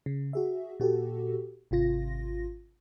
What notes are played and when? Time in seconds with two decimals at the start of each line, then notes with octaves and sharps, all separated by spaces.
0.06 C#3
0.33 F#4 G#4 E5
0.80 A#2 F#4 G4 A4
1.71 G#1 C3 F4 A#6